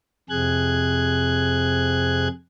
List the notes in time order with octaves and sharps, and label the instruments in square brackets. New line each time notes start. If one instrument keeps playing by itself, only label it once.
[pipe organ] F2 C3 G#4 F#6 G#6